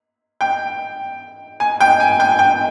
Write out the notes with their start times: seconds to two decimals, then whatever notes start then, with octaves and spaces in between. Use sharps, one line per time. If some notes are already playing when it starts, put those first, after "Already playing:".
0.41 G5
1.60 G#5
1.80 G5
2.00 G#5
2.20 G5
2.39 G5